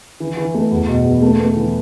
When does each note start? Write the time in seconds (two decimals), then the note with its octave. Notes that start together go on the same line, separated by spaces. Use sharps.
0.20 E3
0.37 E3
0.54 A3
0.71 E2
0.88 B2
1.05 E2
1.22 A3
1.40 A3
1.56 E3